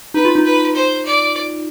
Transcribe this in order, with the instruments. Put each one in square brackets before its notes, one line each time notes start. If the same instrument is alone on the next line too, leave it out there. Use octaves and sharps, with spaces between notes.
[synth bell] D#4 [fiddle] B4
[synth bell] F4
D#4
[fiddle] B4
C5
D5